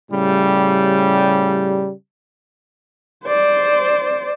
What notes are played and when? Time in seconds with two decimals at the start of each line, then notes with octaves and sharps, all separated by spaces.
0.11 A2 C#3 G3
3.25 C5 D5